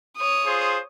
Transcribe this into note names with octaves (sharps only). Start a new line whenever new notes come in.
C#5 D#6
F4 G#4 C5